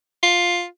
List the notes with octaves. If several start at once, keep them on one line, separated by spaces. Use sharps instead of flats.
F4